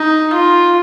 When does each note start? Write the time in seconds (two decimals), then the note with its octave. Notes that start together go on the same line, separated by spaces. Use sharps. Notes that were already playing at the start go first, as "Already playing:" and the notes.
Already playing: D#4
0.33 F4